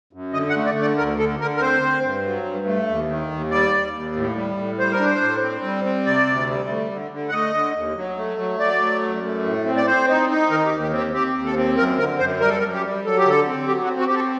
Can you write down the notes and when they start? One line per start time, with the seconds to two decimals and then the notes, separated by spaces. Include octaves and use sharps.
0.13 F#2
0.33 D3 D#5
0.50 F#5
0.56 A3
0.65 D5
0.77 D3 D5
0.97 D2 A#4
1.19 D3 A4
1.40 D3 A#4
1.57 A#4
1.61 C4 C5
1.82 C4
2.03 G2
2.24 F#3
2.45 G2
2.66 A3
2.89 D#2
3.09 D#3
3.31 D#2
3.51 G3 D5
3.73 D#2
3.93 D#2
4.16 A2
4.36 G3
4.58 A2
4.78 G3 C5
4.92 A#4
5.00 D4
5.06 C5
5.22 A2
5.42 C4
5.63 G3
5.84 C4
6.06 C3 D5
6.26 D2
6.48 G3
6.69 A3
6.91 D3
7.11 D3
7.29 F#5
7.33 A3 D#5
7.54 D3
7.75 D#2
7.96 F#3
8.17 A3
8.38 F#3
8.59 F#3 D5
8.81 A3
9.02 F#2
9.24 A3
9.44 A2
9.66 C4
9.77 D5
9.86 C4 C5
10.08 D#4
10.30 D#4
10.50 D#3 A#4
10.65 G4
10.71 D#2
10.83 G4
10.92 C4
10.97 G4
11.13 C4 G4
11.34 D#2
11.45 A4
11.56 C4
11.77 F#2 A#4
11.98 D3 A#4
12.19 F#2 C5
12.40 G3 A#4
12.49 A4
12.59 F#2 A#4
12.73 G4
12.83 G3
13.05 F#3 A4
13.17 G4
13.25 D3 A4
13.47 C4
13.68 F#3 G4
13.84 F#4
13.88 C4
13.99 F#4
14.07 G4
14.10 C4
14.15 A4